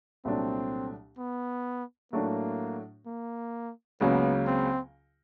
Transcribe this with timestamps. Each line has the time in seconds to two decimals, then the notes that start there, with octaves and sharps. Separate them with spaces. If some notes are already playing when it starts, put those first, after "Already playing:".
0.25 C2 A#2 F#3 A3 C4 D4
1.18 B3
2.13 A2 F#3 A3 A#3 D4 F#4
3.06 A#3
4.01 C#2 C#3 F#3 A#3 B3
4.47 C4